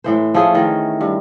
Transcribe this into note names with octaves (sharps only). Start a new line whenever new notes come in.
A2 E3 C5
F3 A3 C#4 G#4
D#3 E3
G2